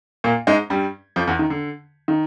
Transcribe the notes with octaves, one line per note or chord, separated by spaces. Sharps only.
A#2 A#3
G#2 G#3
G2 G3
F2 F3
E2 E3
D#3
D3
D#3